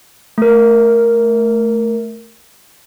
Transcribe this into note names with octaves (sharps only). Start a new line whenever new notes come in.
A3 A#4